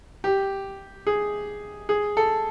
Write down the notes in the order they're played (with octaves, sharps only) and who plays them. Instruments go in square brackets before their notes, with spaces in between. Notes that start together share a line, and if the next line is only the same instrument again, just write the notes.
[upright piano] G4
G#4
G#4
A4